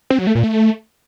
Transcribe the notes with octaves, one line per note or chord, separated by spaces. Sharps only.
C4
F#3
A3
A#2
A3